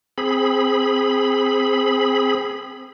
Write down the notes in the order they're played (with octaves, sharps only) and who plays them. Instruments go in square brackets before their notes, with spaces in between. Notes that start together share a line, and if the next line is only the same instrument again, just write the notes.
[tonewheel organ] C4 G#4 B5